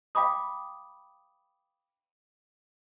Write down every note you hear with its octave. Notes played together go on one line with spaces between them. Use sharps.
F5 G5 B5 D6 D#6